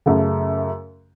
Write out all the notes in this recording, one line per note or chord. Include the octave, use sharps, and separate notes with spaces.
F#2 C#3 A3